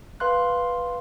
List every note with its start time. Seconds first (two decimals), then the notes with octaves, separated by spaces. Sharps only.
0.20 B4 F5 C6 F#6